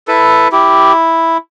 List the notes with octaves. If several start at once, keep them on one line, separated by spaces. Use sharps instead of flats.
E4 A4 B4
E4 G4